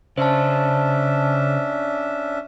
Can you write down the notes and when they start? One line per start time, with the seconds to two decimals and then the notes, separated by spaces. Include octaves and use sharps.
0.17 C#3 C#4 D4 C5 E5 A5